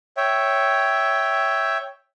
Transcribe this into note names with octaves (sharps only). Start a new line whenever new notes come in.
C#5 E5 G5